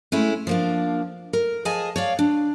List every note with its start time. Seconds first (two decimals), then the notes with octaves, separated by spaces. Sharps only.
0.12 G#3 A3 C#4 E4
0.47 F3 A#3 D4
1.33 A#4
1.65 F3 G#4 D#5 G#5 A5
1.96 C#5 D5 F5
2.19 D4